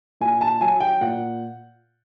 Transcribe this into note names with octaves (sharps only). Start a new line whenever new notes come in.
A#2 G#5
A5
F#3 G#5
G5
A#2 F#5